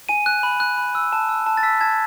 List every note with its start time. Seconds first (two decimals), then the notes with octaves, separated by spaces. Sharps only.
0.09 G#5 D#7
0.26 F#6
0.43 B5
0.60 F#6
0.78 B5
0.95 E6
1.13 A5
1.29 E6
1.46 A5
1.57 A6
1.63 E6 B6
1.81 A5 G#6